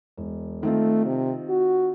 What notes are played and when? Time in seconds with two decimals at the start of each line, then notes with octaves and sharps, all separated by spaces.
0.17 E1
0.63 D#3 A3 C4 F4
1.05 C3
1.49 F#4